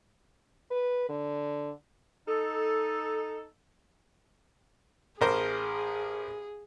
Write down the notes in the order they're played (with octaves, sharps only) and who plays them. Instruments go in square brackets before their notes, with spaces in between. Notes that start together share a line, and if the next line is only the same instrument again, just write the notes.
[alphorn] B4
D3
[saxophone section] D#4 A4
[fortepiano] A1 A#4 C5 [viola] G#4